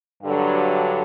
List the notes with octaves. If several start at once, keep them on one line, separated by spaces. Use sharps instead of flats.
G2 D3 F#3